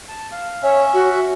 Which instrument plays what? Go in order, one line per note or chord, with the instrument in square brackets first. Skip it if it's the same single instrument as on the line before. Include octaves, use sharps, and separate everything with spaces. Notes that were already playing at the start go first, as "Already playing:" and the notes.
[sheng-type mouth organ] A5
F5
[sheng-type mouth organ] C#4 E5 [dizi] C#5
[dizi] F#4